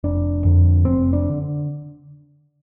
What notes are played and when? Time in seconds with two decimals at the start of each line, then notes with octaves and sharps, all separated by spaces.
0.04 F1 D4
0.45 F2 D3
0.85 F1 C4
1.13 D4
1.30 D3